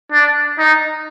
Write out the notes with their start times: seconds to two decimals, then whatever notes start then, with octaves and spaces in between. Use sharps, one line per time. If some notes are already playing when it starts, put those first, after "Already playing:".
0.12 D4
0.58 D#4